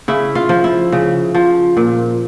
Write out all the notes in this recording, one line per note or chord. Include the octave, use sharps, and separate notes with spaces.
C#3 E4
F4
F3
E4
C#3
F3
A#2